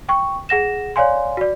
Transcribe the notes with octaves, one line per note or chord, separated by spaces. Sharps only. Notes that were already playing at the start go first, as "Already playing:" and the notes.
G5 C#6
G#4 F#5 A#6 E7
C#5 D5 F5 G#5 C6
F#4 D5